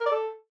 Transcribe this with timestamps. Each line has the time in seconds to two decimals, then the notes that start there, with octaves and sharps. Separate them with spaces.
0.01 A#4
0.06 D5
0.12 A4